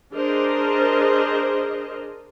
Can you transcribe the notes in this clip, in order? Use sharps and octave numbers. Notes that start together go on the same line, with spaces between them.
D4 G#4 A#4 C5 D#5